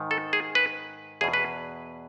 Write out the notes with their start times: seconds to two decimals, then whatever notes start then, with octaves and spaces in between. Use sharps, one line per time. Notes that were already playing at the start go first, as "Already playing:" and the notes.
Already playing: G#2 D#3
0.11 A4
0.33 G#4
0.55 B4
1.21 E2 B2 G#4
1.34 B4